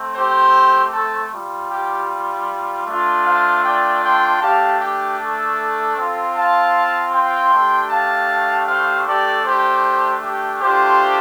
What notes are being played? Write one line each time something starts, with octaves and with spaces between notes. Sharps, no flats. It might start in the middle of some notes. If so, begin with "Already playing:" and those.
Already playing: A3 C4
G4 C5
A4
G3 F4
G4
A3 D4 F4
C5 F5
D5 G5
G5 C6
A3 D4 G4 F5 A5
G4
A4
C4 F4
F5 A5
G5 C6
A3 D4 G4
F5 A5
C5 F5
A3 D4 G4 A4 D5
G4 C5
G4
A3 D4 F4 G4 C5